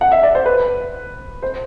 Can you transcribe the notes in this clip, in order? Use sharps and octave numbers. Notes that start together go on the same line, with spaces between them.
F#5
E5
D5
C5
B4
C5